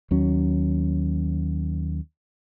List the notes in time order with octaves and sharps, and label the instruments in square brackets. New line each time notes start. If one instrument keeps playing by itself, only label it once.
[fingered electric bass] D#2 F#3 C#4